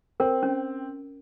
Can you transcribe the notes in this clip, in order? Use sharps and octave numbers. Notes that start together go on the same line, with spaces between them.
C4 A#4
C#4